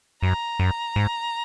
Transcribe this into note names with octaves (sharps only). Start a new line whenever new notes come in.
F#2 A#5
F#2
G#2